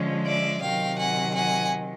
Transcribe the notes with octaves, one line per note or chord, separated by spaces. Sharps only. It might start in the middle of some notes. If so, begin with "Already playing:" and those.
Already playing: D3 F3 G#3 C#4
D5 E5
C3 D#3 F#3 F5 G5
F#5 G#5
F#5 G#5